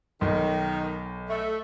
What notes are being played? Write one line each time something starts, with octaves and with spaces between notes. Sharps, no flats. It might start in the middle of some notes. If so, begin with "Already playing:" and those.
B1 D#3
A3